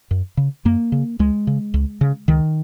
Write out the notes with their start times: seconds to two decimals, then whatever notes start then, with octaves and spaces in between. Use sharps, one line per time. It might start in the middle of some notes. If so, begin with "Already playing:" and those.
0.11 F#2
0.37 C#3
0.65 F#2 A#3
0.92 C#3
1.19 C#2 G#3
1.47 C#3
1.74 C#2
2.01 C#3
2.28 C#2 D#3